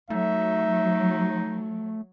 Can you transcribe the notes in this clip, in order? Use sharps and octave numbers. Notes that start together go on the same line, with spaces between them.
F#3 A3 D#4 E5